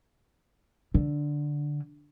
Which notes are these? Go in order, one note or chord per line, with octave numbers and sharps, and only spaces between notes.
D3